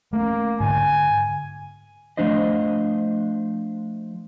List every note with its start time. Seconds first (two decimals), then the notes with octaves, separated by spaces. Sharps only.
0.13 A3 A#3 C#4
0.60 G#2 D3 G#5
2.17 F3 A3 D4 C5 D#5